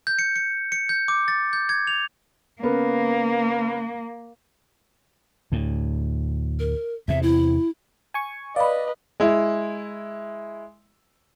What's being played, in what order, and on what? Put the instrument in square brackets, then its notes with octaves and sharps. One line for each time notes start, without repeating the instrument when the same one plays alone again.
[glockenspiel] G6
C#7
C#7
C#7
G6
D6
A6
G6
G#6
F7
[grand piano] C#3 B3 A#4 [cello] A#3
[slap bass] D2 A2
[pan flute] A#4
[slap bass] E2 C3 [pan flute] E5
[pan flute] E4
[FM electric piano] G#5 C#6
[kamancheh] B4 D#5 [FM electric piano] D5 [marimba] F5 B5
[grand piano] G#3 E4